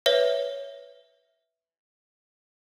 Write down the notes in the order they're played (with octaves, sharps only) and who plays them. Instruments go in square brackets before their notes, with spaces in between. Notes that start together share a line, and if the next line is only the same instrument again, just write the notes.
[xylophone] B4 C#5 E5